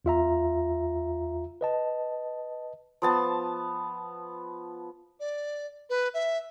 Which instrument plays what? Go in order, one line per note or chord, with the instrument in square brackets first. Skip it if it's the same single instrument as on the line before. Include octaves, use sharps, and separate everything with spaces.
[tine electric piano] E2 F4 E5 A#5
B4 D#5 A5
[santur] F3 B3 A5
[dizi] D5
B4
E5